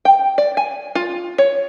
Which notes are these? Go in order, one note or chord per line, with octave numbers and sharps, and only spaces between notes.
G5
D5
G#5
F4
C#5